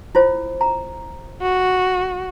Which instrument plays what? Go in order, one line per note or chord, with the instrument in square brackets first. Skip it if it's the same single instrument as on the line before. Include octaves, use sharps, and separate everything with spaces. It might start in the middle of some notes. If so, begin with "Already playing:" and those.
[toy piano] E4 F4 C5
A#5
[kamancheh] F#4